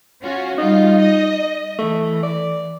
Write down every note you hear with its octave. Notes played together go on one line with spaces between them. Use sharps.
C#4 F4 F#4
G3 D#4 F4
D#5
E3 A3
D5